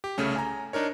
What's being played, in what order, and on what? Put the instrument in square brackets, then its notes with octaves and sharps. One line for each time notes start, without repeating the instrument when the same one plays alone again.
[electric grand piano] G4
C2 C#3 A3 C#4
G#5 A#5
D4 D#4 A#4 C#5